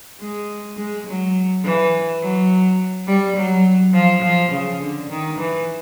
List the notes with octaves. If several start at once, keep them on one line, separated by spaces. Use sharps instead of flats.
G#3
G#3
F#3
E3
F#3
G3
F#3
F3
F3
C#3
D3
D#3
E3